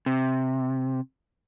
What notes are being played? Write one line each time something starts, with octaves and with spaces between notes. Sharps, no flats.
C3